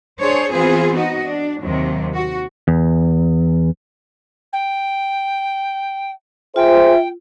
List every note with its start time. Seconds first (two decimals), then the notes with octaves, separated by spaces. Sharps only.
0.20 D4 G#4 C5 C#5
0.50 E3 B3 C4 F4 G#4 C5
0.95 D#4 F#4 D#5
1.25 D4
1.61 D#2 C3 D#3 F#3
2.14 F#4
2.68 E2
4.52 G5
6.56 F4 G#4 C5 E5 G5